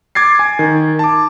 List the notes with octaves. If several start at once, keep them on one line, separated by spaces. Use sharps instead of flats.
D6 G#6 A6 C7
G#5
D#3
A5 D6